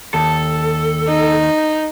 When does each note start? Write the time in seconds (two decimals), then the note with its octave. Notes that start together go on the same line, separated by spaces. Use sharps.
0.14 D#2 A4
1.08 D#4